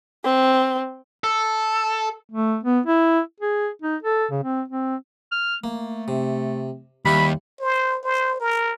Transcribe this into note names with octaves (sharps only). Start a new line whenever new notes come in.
C4
A4
A3
B3
E4
G#4
D#4
A4
C#3
C4
C4
F6
A3 A#3
C3
D#2 G3 E4 B5 C#6
C5
C5
A#4